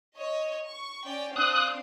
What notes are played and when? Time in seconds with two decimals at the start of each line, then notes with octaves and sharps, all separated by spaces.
0.18 C#5 D#5
0.65 C#6
1.05 C#4 D5 G5
1.36 C4 D4 F5 D#6 F#6